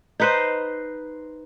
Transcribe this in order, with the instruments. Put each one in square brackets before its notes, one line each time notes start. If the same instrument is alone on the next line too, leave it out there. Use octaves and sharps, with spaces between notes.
[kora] D#4 B4 C5